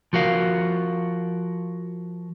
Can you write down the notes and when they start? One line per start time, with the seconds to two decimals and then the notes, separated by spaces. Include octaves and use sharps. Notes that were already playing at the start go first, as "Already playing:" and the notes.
0.13 F3 F#4 A#4 F5